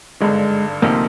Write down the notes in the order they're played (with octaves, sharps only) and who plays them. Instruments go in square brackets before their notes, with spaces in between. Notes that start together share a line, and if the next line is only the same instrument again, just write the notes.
[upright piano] G#1 G2 D3 [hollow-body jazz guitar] G#3
[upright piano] D2 C3 F3 C4 D#4 [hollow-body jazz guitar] A#3